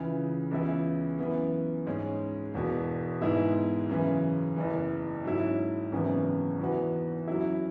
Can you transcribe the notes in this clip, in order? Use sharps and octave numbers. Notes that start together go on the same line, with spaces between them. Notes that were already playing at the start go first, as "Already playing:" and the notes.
Already playing: C#2 C#3 E3
C#2 C#3 E3 B3 E4
F#2 E3 B3
G#2 G#3 C#4
E1 E2 B2
G#2 G#3 B3 E4
F#2 C#3 E3
F#1 E2 E3
G#2 F#3 C#4 E4
G#1 F#2 C#3 E3 B3
E2 E3 B3 F#4
F#2 F#3 E4